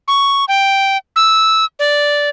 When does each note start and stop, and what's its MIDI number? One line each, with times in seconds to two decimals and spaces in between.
0.08 0.45 85
0.48 0.97 79
1.16 1.65 88
1.79 2.29 74